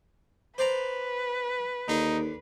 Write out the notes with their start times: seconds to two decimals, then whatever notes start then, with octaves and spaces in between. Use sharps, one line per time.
0.58 B4 C5 D5 A#5
1.88 D#2 D3 D#4